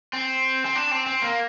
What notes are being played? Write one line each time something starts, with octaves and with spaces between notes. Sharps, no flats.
C4
C4
D4
C4
C4
A#3